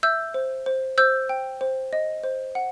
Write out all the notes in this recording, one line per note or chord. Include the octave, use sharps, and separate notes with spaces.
E5 E6 G6
C5
C5
C5 E6 G6
G5
C5
D#5
C5
F#5